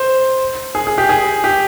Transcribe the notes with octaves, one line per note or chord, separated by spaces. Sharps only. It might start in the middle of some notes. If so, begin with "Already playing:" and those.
Already playing: C5
G#4
G#4
G4
G#4
G4